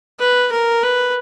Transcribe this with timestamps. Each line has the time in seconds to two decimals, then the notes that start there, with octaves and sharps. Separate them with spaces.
0.19 B4
0.52 A#4
0.83 B4